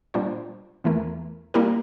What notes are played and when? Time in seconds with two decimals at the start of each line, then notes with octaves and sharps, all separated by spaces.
0.14 A#2 G3 D4 F4 C5
0.84 E2 E3 A3 E4 A#4
1.54 G3 A#3 E4 G4 A#4